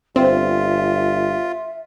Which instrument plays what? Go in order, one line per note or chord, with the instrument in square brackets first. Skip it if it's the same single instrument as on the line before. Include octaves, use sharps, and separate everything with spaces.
[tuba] G1 [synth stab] C4 [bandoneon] F4 [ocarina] E5